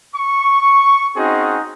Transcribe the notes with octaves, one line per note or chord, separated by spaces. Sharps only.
C#6
C4 C#4 D#4 F#4 G#4